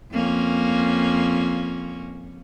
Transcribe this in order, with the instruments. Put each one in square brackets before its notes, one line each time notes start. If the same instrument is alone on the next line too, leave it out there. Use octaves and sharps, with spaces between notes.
[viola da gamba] F2 A#3 C#4